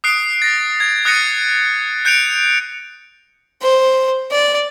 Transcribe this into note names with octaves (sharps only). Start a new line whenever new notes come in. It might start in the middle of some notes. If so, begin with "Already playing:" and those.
D#6 F#6 C7 D7
A6 A#6
G#6
D#6 F#6 A6 A#6 C#7 D#7
F#6 G6 C#7 D7 F7
C5
D5